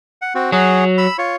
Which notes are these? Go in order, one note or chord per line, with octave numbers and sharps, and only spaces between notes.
F#5
C4 F#4
F#3 F#4 G#4
B5 E6
F4 C#5